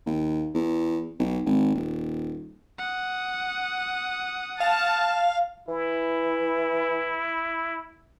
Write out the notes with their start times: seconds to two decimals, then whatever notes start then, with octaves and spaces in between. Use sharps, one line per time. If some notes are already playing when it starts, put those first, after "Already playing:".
0.06 D#2
0.54 E2
1.19 B1
1.46 G#1
1.75 D#1
2.78 F#5 D#6
4.60 F5 A5
5.68 E3 E4